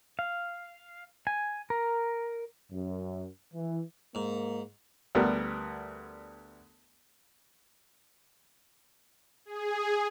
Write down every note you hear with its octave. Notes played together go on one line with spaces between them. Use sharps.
F5
G#5
A#4
F#2
E3
G#2 A#3
D2 G3 B3 A#4
G#4